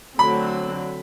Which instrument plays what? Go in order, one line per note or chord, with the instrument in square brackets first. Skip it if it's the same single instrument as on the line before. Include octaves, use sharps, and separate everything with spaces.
[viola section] D3 F#3 A3 C4 [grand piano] B5